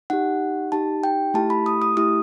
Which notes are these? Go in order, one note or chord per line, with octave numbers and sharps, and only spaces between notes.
D#4 G4 F#5
D#4 G4 A5
G5
A3 E4 G4 A5
B5
D#6
D#6
A3 E4 G4 D#6